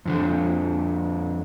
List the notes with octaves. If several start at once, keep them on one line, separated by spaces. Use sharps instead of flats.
F2 D3 F3